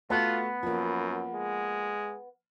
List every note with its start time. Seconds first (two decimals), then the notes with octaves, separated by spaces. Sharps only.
0.10 A3 B3 F4 F#4 A5
0.63 F#2 F3 A#3
1.33 G#3